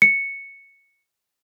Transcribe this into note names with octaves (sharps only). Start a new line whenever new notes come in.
C#7